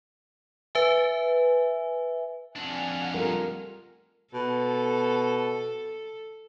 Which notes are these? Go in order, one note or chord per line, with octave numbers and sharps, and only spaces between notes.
B4 E5 G#5
F2 D4 F#5 G#5 F6
G3 A3 F4 A#4
B2 A4